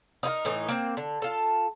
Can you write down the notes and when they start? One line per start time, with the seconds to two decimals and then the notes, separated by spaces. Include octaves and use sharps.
0.23 D#4 E4 A#4
0.45 A2 E3 D#4
0.69 A#3 C4
0.97 D3
1.22 F4 A4